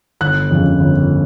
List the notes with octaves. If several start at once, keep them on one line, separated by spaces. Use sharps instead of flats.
G1 F#6
F2 C#3
G1